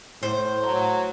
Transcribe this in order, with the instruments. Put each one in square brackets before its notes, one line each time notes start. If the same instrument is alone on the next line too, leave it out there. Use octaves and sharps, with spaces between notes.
[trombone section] A2 [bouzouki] C5
[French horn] F#3